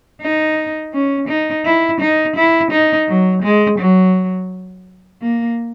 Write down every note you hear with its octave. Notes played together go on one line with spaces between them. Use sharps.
D#4
C#4
D#4
E4
D#4
E4
D#4
F#3
G#3
F#3
A#3